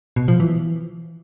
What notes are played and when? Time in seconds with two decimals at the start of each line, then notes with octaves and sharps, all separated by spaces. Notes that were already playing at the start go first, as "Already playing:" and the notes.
0.16 B2
0.28 F3
0.40 E3